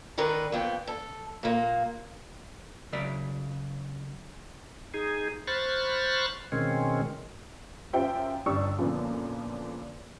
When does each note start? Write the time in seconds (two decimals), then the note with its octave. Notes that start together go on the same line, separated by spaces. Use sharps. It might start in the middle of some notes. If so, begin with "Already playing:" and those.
0.18 D3 D#3 D#4 A#4 B4
0.52 F2 B3 G5
0.87 A4
1.43 A#2 A#3
2.93 C#3 F#3 D5 E5
4.94 D#4 G#4
5.47 C5 B5 C#6 F6 F#6 A6
6.52 B2 D#3 G#3 C4 C#4
7.93 F#2 F4 G4 C5 E5 G5
8.46 G1 D4 G4 C#6 D#6 E6
8.78 F#2 A#2 D3 F3 B3